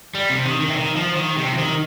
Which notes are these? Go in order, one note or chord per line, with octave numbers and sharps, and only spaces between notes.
G3
C3
D#3
D#3
C3
D#3
F3
D#3
C3
F3
D#3